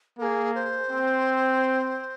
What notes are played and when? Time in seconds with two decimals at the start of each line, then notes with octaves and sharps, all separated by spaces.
0.19 A#3 G#4 A#4
0.55 C5
0.91 C4